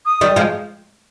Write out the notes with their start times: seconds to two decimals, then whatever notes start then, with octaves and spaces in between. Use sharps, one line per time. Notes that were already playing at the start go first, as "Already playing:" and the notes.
0.05 D#6
0.21 D#3 G3
0.36 F3 G#3